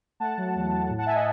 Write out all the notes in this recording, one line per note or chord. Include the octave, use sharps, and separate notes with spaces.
A3 F#5 A5
F#3
E2
F#3
A2
F#5 A5
A2 E5 G#5
D#5 F#5